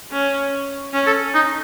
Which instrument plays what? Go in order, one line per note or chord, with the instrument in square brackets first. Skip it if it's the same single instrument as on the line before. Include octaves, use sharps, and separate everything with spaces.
[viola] C#4
C#4
[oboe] A4
D#4